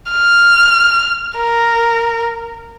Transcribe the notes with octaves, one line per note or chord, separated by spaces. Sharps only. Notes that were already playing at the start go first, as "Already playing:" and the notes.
F6
A#4